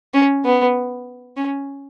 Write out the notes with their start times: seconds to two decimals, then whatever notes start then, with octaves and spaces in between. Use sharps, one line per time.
0.14 C#4
0.45 B3
1.37 C#4